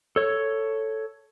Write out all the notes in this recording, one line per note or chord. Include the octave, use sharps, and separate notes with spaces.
A4 C#5